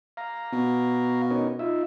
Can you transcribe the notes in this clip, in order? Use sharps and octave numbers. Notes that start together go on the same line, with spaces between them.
F5 A#5
B2
C#4 D#4 A#4
D#4 F4 E5